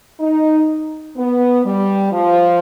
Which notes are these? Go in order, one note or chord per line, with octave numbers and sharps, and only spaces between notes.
D#4
B3
G3
F3